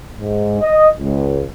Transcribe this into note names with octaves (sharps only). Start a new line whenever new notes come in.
G#2
D#5
C#2